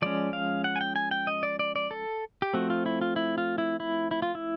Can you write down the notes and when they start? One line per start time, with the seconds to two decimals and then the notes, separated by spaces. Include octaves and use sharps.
0.02 F3 G#3 C#4 D5
0.33 F5
0.64 F#5
0.76 G#5
0.81 G5
0.96 G#5
1.11 G5
1.27 D#5
1.43 D5
1.59 D5
1.76 D5
1.91 A4
2.42 G4
2.53 F3 A3 C4 F#4
2.70 F4
2.86 E4
3.01 F4
3.16 E4
3.38 F4
3.58 E4
3.80 E4
4.11 E4
4.22 F4
4.35 E4